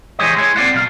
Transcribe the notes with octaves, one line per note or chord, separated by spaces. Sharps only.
E3 G#3 G4 C5 C#5 D#5
G#3 E4 C#5
A#3 C4 G4 D5 F5 F#5
B2 F#3 F5